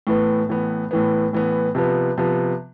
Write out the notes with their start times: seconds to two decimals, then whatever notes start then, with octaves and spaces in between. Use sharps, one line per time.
0.07 A2 E3 B3
0.49 A2 E3 B3
0.91 A2 E3 B3
1.33 A2 E3 B3
1.75 C3 F3 B3
2.18 C3 F3 B3